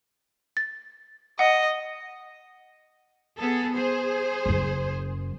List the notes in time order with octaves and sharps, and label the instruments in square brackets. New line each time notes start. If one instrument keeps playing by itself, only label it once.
[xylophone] A6
[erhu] D#5 [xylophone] F#5
[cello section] B3 G#4 A4
G#4 C5
[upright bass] F#1 F#2